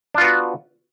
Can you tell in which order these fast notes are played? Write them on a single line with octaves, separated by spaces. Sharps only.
D4 F4 B3 F#4